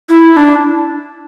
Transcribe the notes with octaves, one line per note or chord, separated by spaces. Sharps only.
E4
E4
D4